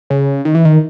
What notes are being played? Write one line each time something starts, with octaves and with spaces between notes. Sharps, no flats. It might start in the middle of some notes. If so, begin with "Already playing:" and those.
C#3
D#3
E3
D#3